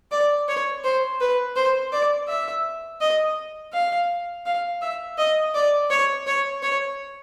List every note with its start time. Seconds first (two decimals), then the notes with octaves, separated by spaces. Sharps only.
0.11 D5
0.48 C#5
0.84 C5
1.21 B4
1.56 C5
1.92 D5
2.28 E5
3.01 D#5
3.73 F5
4.46 F5
4.81 E5
5.18 D#5
5.54 D5
5.90 C#5
6.27 C#5
6.63 C#5